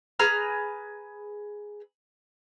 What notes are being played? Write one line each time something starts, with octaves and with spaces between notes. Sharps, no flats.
G#4 B4 A#5 F6